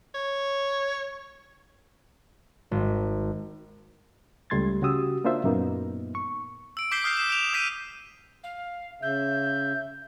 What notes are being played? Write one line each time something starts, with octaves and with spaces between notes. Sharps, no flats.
C#5
G#1
C#2 G3 A3 C6 G#6 A6
C#3 F#4 G4 D#6 E6
A#3 D4 F4 C5 E5
F#2 A#2 A#3 B3 D#4
C#6
E6 D7
D6 G6 B6 C7 G7
D#6 F6 G6 C7
E7
D7 E7 F7
D#6 G6 B6 D#7
F5
C#3 E5 G6